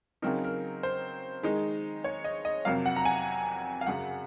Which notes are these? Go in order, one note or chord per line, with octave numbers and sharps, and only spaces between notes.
C#3 F#3 C4 D#4 A#4
A#4
C5
D#3 G#3 D#4
C#5
D#5
D#5
F2 C3 F#3 A#3 F5
F#5
A#5
G#5
F5
F#2 C#3 F#3 F#5